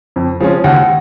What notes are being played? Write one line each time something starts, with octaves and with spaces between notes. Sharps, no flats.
F2
F3 G#3 C#4
D#2 F#5